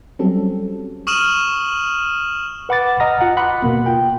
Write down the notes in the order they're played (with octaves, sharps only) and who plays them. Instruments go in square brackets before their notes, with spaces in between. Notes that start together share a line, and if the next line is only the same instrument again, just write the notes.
[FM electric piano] F#3 G3 C4 C#4 A4
[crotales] C#6 D#6 F6 D#7 E7 F#7
[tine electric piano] B4 F#5 B5 D6 A6
D#5 F#5 A#5 D#6 F6 A#6
F4 F#5
F#5 B5 C6 D6 D#6 F#6
B2 A#3 B3
F4 G5